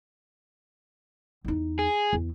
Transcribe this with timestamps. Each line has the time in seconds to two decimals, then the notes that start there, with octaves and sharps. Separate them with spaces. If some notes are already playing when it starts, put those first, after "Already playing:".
1.45 E2 D#4
1.79 G#4
2.13 E2